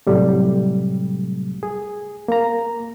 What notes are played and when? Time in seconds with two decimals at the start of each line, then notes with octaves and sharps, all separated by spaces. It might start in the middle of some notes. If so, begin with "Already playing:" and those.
0.07 A2 C3 F#3 G3 A3
1.63 G#4
2.28 A#3 A#5